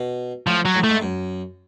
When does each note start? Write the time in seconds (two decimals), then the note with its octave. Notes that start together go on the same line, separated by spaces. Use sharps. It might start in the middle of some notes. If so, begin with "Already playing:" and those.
Already playing: B2
0.47 A2 F3
0.65 F#3
0.75 A2
0.84 A3
0.89 G#2
1.02 F#2